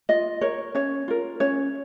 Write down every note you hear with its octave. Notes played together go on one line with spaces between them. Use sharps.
F4 D#5
A#4 C#5
C#4 C#5
F4 A#4
C#4 C#5